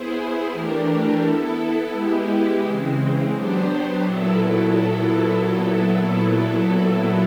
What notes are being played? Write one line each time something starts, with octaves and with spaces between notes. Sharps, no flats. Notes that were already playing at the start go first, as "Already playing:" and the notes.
Already playing: B3 E4 G#4 C5
E3 A3 D4 G4 A#4
B3 E4 A4
G#3 B3 E4 G4
C#3 E3 G#3 C4
F#3 B3 D4 G4 C5
A#2 F#3 B3 E4 A4